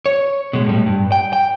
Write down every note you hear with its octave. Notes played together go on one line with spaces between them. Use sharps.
C#5
B2 G#3
A2 G3
G2
G5
G5